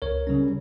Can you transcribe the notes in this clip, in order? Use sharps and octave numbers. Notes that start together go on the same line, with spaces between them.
C#2 A#4 C#5
C#3 G3 C#4